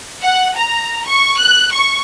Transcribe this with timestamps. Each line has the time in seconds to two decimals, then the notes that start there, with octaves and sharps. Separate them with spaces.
0.22 F#5
0.56 A#5
1.06 C#6
1.38 F#6
1.72 C#6